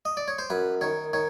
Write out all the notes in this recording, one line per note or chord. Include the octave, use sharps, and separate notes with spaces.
D#5
D5
C#5
C5
F#2 B4
D#3 C#5
D#3 C#5